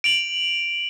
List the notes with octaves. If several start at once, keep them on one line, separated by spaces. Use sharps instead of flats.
D7 F7 F#7